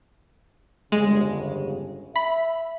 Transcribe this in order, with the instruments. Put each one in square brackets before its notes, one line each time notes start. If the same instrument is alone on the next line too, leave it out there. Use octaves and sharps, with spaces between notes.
[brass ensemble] G1 F2 C#3 [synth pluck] G#3
[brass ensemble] E5 [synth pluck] B5